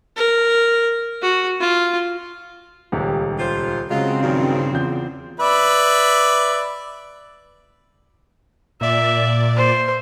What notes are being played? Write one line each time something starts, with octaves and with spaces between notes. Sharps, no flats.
A#4
F#4
F4
D#1 C#2 G4
F4 C5
C#3 F#3 G#3 C4 F4
G2 A#2 D#3 F#3 C#4
E2 F4 G6
B4 D5 E5
A#2 D5 E5
C5